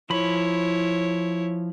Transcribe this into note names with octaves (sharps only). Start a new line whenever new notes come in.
F3 E4 C#5 B5